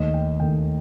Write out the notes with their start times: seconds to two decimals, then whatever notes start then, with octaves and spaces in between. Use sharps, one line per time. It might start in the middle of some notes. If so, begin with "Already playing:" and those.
Already playing: D#2 D#3 A3 D#5
0.14 G5
0.40 D#2 D#3 A3 G5